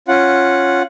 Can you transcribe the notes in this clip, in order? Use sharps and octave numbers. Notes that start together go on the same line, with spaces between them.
C#4 F4 F#5